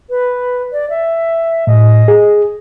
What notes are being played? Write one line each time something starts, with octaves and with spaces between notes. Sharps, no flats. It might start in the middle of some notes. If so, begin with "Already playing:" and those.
B4
D5
E5
A2 D#5
G#4